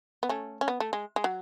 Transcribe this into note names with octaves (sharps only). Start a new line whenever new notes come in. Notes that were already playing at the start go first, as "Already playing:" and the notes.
B3
A3 C#4
C#4
B3
A3
G#3
G#3
F#3